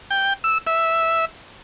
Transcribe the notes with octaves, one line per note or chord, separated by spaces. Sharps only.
G5
E6
E5